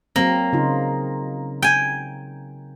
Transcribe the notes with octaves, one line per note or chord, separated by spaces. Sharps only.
F#3 A#3 C4
C#3 D#4 F4
G5 G#5